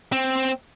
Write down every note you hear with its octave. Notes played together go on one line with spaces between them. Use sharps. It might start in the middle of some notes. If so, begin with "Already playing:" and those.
C4